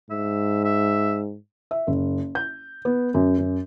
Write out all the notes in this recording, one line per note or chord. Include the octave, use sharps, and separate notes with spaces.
G#2 E5
E5
E5
F#1
G6
B3
F#2
F#2